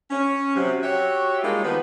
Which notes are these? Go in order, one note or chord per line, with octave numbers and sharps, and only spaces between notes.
C#4
C3 F#3
F#4 G4 C#5 E5
G3 G#3 A#3 D4 D#4 F4
D#3 F3 B3 B4